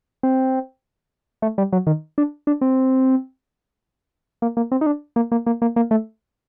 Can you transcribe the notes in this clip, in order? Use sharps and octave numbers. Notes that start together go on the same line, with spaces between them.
C4
A3
G3
F#3
D#3
D4
D4
C4
A#3
A#3
C4
D#4
D4
A#3
A#3
A#3
A#3
A#3
A3